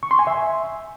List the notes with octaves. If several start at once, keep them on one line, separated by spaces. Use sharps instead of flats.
C#6
C6
G#5
E5